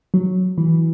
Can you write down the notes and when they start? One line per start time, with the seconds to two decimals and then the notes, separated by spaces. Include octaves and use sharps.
0.14 F#3
0.58 E3